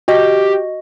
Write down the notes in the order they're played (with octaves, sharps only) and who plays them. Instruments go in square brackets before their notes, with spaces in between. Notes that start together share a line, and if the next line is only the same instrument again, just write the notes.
[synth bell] F#4 D#5 [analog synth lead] G4